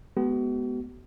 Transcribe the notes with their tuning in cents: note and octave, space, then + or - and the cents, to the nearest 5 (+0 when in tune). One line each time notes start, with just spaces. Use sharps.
G#3 +30 B3 +0 F#4 +45